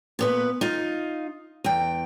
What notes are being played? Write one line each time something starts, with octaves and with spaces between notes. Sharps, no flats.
A#2 B3 B4
D#4 F4
E2 G5